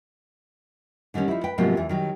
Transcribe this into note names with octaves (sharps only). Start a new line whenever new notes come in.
D3 D#3 G3 C4 C#4
F3 D#4 E4
B4 G5
G#2 C3 F3 F#3 A#3 B3
E2 E3
D#3 F#3 G3